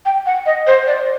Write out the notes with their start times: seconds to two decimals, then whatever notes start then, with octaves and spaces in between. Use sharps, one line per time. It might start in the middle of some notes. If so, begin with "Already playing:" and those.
0.06 G5
0.26 F#5
0.46 D#5
0.67 C5
0.87 D5